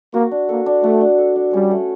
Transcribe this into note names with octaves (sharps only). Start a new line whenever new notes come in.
A#3 F#4
D4
A#3 A4
D4
A3 F#4
D4
A4
D4
G3 C#4
A3